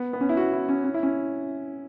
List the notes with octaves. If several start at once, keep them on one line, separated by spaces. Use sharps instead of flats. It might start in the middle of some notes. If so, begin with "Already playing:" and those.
Already playing: B3
B3
C#4
E4
F#4
E4
C#4
C#4
E4
C#4